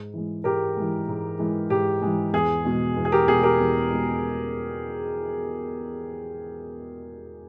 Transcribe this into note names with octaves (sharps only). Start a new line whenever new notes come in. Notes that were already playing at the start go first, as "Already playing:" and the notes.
Already playing: G#2
E3 G#3
G#2 G4 A#4
E3 G#3
G#2
E3 G#3
G#2 G4
E3 G#3
E2 G#4
B2 G#3
E2
G#4
G4 A#4
B2 G#3 G#4
G4 A#4
E2
B2 G#3